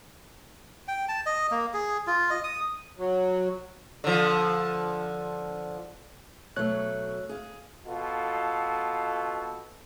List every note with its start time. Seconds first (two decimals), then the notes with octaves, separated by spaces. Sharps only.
0.88 G5
1.08 A5
1.26 D#5
1.51 A#3
1.74 G#4
2.07 F4
2.30 D#5
2.44 D#6
2.98 F#3
4.04 D3 F3
6.56 B2 F#3 A3 C#5 F#6
7.29 G#4 F5
7.86 B2 F4 A4